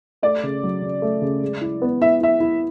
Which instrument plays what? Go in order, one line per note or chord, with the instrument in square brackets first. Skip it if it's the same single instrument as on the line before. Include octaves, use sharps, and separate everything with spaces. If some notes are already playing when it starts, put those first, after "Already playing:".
[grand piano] A3 [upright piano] D5
[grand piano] C#3
F#3
C#3
A3
C#3
G#3
E4
B3
[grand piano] E4 [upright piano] E5
[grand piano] E4 [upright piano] E5
[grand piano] E4